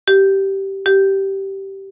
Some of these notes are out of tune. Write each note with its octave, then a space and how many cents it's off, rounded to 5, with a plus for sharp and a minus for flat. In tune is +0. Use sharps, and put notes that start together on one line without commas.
G4 -10
G4 -10